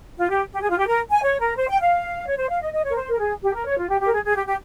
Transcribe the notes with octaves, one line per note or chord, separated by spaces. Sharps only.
F4
G4
G4
G#4
F4
G4
A#4
G#5
C#5
A#4
C5
G5
F5
C#5
C5
F5
D#5
D#5
C#5
A#4
C5
A#4
G#4
G4
A#4
C#5
F4
G4
G4
A#4
G#4
G#4
G4
G4